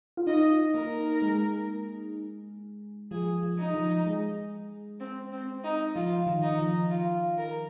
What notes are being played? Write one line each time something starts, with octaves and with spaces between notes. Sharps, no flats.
F4
D#4 D#5
A#3 A#4
G#3
F3 G#4
F3
D#4
F3
G#3
C4
C4
D#4
F3 F4
D#3
D#4
F3
F4
A#4